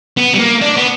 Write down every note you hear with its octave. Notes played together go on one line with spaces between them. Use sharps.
B3
G3
A#3
D4
B3